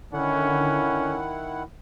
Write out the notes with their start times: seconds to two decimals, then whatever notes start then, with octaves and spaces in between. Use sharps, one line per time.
0.13 D3 D#3 C#4 E4 F#5